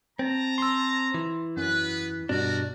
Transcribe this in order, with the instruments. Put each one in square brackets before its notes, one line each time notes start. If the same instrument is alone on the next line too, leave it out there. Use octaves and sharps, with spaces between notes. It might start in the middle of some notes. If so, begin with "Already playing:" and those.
[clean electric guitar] C4 [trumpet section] A5 A#5
[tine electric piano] C6 E6
[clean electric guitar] E3
[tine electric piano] F#2 [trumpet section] B3 B4
[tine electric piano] G2 B2 [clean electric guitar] D4 [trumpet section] F#4 A#4 D5